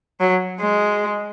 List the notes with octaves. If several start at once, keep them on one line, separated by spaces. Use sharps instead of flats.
F#3
G#3